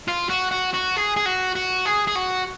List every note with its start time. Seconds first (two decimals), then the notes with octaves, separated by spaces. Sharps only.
0.08 F4
0.29 F#4
0.51 F#4
0.74 F#4
0.96 G#4
1.17 G#4
1.26 F#4
1.55 F#4
1.85 G#4
2.07 G#4
2.15 F#4